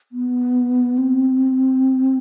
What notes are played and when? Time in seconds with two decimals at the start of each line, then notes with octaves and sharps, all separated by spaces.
0.12 B3
0.98 C4